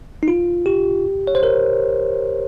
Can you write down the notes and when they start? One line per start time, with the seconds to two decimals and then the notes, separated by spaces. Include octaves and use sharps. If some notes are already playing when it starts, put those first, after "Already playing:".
0.23 D#4
0.28 F4
0.66 G4
1.27 C#5
1.35 C5
1.43 A#4